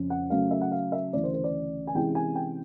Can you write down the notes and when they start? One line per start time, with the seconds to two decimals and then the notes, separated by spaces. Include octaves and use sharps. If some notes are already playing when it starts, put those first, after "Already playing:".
Already playing: F2 C#3 F3 C#4
0.10 F#5
0.30 C#3 F#3 A3 C#4 F5
0.51 E5
0.61 F#5
0.71 F5
0.92 E5
1.13 D2 C#3 E3 D5
1.24 C5
1.34 C5
1.44 D5
1.87 G#5
1.95 C3 E3 G#3 C#4 E4 G5
2.15 G#5
2.35 G5